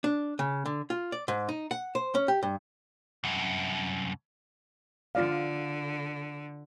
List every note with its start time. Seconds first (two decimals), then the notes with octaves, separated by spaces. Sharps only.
0.04 D4
0.39 C#3
0.66 D3
0.90 F4
1.12 D5
1.28 G#2
1.49 D#4
1.71 F#5
1.95 C5
2.15 C#4
2.28 G4
2.43 G2
3.24 C2 F#2
5.15 D3 F4 D5 F5